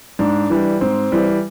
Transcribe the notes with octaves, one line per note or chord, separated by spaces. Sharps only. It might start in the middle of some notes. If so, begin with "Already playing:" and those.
G#2 D4
E3 G3
G#2 C4
E3 G3